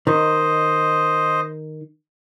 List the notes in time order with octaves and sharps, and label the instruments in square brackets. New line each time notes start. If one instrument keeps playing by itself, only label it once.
[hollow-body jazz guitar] D#3 [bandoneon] C5 D#5